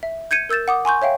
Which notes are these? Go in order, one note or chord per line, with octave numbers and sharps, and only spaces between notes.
E5
G6 G#6 C#7 D#7
A#4 E6 G6 A6 E7
F#5 D6 D#6
G#5 C6 C#6 G6
C#5 E5 F5 G5